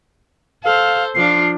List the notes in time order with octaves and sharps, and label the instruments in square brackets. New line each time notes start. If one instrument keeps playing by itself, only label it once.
[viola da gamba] A4 C5 [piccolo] F5
[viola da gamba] F3 D4 F4 [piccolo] C7